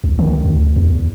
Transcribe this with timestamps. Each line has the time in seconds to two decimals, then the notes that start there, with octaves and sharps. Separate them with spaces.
0.04 C#2
0.19 D#3
0.45 D2
0.76 E2